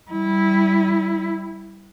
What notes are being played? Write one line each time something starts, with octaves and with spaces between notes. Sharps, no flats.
G3 E4